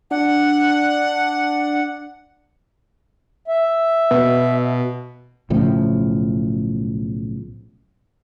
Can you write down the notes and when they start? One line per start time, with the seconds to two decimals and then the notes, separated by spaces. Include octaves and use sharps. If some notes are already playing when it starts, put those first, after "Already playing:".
0.11 D4 F#5
3.48 E5
4.11 B2
5.50 B1 A2 C#3 F3